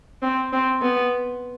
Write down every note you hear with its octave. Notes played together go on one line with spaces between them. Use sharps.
C4
C4
B3